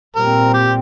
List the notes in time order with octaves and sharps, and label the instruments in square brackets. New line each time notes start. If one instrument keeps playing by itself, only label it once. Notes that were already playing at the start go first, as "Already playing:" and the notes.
[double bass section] A#2 G3 C4 [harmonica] A#4
[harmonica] G4